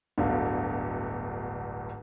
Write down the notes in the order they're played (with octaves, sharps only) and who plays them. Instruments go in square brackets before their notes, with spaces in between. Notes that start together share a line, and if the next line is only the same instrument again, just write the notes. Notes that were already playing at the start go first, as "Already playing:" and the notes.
[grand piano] D1 G1 D3 [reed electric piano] B3 F#4 F5